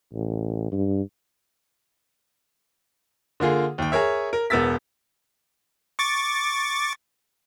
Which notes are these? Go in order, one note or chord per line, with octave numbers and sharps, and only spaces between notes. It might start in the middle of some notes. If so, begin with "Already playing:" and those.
A1
G2
D3 A#3 F4 G#4
D#2 G5
G#4 A#4 C#5 E5
A#4
E1 B3 A#4 E6 A6 B6
C#6 D6 A6